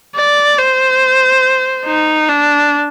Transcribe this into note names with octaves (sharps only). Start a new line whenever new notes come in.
D5
C5
D#4
D4